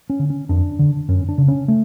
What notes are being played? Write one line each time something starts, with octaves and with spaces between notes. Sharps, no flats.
C#4
D3
C#4
F2 D4
D3
F#2 C#4
D4
C#3
C#4
A3